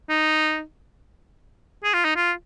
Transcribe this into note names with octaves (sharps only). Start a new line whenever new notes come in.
D#4
G#4
F4
D#4
F4